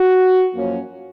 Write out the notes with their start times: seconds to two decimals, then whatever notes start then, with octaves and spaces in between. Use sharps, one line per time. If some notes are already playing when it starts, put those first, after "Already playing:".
Already playing: F#4
0.54 F#2 F3 A#3 C#4